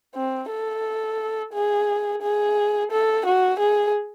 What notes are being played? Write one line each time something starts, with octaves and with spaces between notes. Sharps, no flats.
C4
A4
G#4
G#4
A4
F#4
G#4